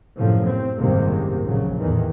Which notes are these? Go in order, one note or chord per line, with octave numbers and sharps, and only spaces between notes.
F#2 A2 C3 F3
C4
F#1 C2 G#2 C3 D#3 A#3
A#1 C#3 F#3
E2 A2 D#3 E3